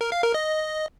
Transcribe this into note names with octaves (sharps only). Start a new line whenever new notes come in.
A#4
F5
A#4
D#5